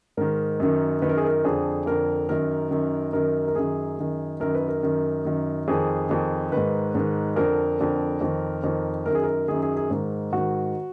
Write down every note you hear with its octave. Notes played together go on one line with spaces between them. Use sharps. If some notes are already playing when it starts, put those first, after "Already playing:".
G#2 D#3 A#4
F#2 D#3
F#2 D#3 B4
A#4
G#4
A#4
F2 D3 G#4
F2 D3 A#4
F#2 D#3 A#4
F#2 D#3
F#2 D#3 A#4
A#4
F#2 D#3 G#4
F#2 D#3
F#2 D#3 A#4
B4
A#4
F#2 D#3
F#2 D#3
F2 D#3 G#4
F2 D#3
G#2 D#3 B4
G#2 D#3
F2 D3 A#4
F2 D3
F2 D#3
F2 D#3
F#2 D#3 A#4
G#4
A#4
F#2 D#3 G#4
G#4
G#4
G#2 D#3
G#2 D#3 F#4